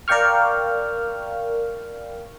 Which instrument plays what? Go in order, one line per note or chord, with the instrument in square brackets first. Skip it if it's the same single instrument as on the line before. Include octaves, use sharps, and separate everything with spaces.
[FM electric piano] A#4 D5 F5 G5 C#6 F6